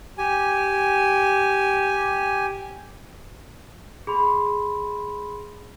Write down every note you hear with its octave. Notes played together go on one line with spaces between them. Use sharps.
G4 G#5
G#4 B5 C6